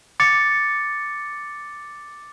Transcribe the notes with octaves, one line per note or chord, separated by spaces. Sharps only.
D6 A6 C#7